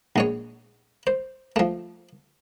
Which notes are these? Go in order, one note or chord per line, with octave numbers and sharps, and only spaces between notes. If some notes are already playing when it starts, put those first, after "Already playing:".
A#1 G#3 C#5
C5
F3 A3